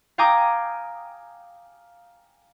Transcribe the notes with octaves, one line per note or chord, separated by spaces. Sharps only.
F5 G5 G#5 A#5 D6 D#6